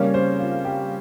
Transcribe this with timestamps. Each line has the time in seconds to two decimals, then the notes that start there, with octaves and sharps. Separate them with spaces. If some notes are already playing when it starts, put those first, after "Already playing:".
Already playing: C#3 G3 A#3 C#4 C#5
0.14 C5
0.40 F4
0.65 G4